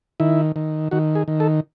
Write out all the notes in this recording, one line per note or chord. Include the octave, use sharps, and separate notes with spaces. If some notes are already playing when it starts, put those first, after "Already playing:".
D#3 E4
D#3
D#3 F#4
G#4
D#3
A4